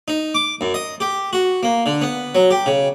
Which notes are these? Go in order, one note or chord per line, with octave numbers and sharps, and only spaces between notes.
D#4
D6
F#2
D#5
G4
F#4
A#3
D3
B3
F#3
G4
C#3